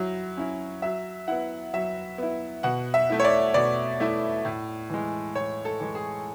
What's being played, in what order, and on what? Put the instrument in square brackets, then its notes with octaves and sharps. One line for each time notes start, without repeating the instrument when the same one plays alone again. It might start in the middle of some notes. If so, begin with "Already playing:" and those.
Already playing: [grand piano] F#3 E4
C#4 E4
F#3 E5
B3 E4 F#5
F#3 E5
B3 E4
B2 F#5
E5
A3 E4
C#5
D5
B2 D5
A3 E4
A2
E3 G#3
A2 C#5
A4
E3 G#3
G#4